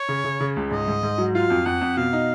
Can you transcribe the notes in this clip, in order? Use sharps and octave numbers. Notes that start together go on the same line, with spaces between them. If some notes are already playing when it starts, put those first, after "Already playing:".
Already playing: C#5
C#3
C#3
C#3
C#2
G#2 D#5
G#2
G#2
F#3
F4 F5
F2
F2 F#5
F2
B2 F5
D#4